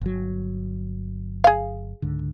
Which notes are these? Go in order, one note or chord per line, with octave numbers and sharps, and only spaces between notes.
G1 F#3
G#4 F5
C#2 G#2 D3